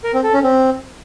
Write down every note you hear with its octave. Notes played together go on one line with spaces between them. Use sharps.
A#4
C4
A4
C#4
C4